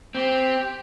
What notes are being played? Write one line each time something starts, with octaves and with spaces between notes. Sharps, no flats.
C4 G4